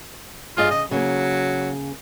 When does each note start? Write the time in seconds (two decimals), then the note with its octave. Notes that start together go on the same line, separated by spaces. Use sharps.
0.57 G2 F4 G#4 D#5
0.71 C#3 D#5
0.91 C#3 F#3 A#3